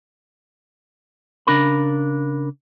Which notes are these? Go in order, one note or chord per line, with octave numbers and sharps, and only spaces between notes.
C#3 D4 A#4 B5